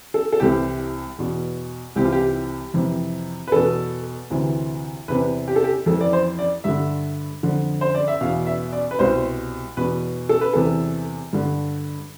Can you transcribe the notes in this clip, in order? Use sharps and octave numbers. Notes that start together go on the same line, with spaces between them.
A4
A4
C2 C3 E3 G4
E2 B2
C2 C3 E3 G4
F4
G4
F2 C3 E3
B4
E2 B2 A4
D2 C3 E3
E2 C3 E3 B4
G4
A4
G4
F2 E3 A4
D5
C5
D5
G2 D3 E5
F2 D3
C5
D5
E5
E2 B2 F5
E5
D5
B4
C2 B2 C5
E2 B2 B4
A4
B4
E2 C3 E3 A4
G2 D3